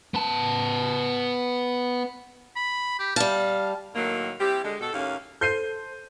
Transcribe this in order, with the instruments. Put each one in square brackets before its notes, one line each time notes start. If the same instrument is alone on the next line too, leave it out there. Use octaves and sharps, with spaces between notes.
[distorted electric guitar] B3 A5
[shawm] B5
G4
[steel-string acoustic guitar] G3 A5 [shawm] F5
[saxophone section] A2 D#3 F#3 A#3
G3 C4 E4 G4
D3 G#3
B2 A4
D#2 A2 A#3 C#4 F5
[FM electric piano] A4 C5 [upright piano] G6 C7 D#7